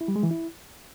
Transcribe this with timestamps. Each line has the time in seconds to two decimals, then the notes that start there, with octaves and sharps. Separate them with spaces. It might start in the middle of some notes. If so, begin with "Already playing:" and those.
0.01 E4
0.08 G3
0.16 G#3
0.23 E3
0.31 E4